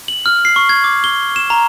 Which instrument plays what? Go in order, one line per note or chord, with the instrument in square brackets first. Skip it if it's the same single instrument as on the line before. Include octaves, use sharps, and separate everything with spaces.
[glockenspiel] F#7
F6
C7
C#6
G#6
D6
G7
E7
A#5